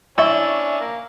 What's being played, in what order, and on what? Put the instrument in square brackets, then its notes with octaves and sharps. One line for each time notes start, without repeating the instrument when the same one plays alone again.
[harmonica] C#4 D4 [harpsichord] E4 [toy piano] E5 C#6
[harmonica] A#3